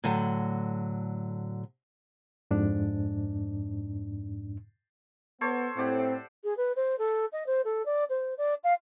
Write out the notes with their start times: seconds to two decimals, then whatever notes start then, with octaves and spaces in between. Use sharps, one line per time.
0.04 A2 D3 F#3
2.51 F2 G#2 D4
5.41 B3 A4 C5 C#5
5.77 A2 C4 G4 D5 F#5
6.44 G#4
6.57 B4
6.76 C5
6.99 A4
7.33 D#5
7.47 C5
7.65 A4
7.86 D5
8.10 C5
8.38 D5
8.64 F5